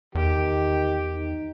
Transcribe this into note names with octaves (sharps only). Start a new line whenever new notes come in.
E2 D#3 G4
D#4